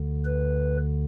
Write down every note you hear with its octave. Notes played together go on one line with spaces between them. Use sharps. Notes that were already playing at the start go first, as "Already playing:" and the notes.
Already playing: D2 D3
B4